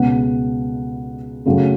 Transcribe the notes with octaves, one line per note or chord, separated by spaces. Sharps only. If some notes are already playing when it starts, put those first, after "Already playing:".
Already playing: C#2 B2 G#3 B3 F#5
F#2 C#3 F#3 A3